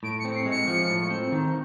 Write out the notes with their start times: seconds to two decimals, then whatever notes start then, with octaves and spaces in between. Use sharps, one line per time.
0.03 A2 D7
0.20 C#7
0.25 C4
0.36 C7
0.46 G#3
0.51 C#7
0.68 F3
0.89 A2
1.10 C4
1.32 D#3